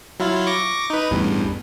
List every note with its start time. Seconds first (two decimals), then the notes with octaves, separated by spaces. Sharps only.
0.20 F#3 E4 F4
0.47 C#6 D6 A#6
0.90 D#4 B4
1.11 A1 E2 G2